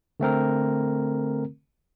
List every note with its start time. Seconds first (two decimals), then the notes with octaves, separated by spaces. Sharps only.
0.20 D3 A3 C4 A#4